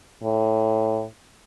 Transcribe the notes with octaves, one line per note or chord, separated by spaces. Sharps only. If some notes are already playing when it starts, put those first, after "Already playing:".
A2